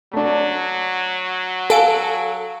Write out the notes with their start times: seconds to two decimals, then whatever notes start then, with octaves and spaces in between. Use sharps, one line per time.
0.13 F#3 A3 D4
1.70 A4 F5 G#5 D7